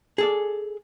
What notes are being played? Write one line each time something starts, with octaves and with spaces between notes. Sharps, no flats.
G#4 A4 D5